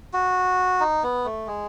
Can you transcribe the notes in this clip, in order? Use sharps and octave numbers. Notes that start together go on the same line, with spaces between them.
F#4
D#4
B3
A3
G#3